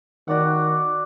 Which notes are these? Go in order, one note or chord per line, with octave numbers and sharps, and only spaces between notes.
D#3 F#4 D5 F#5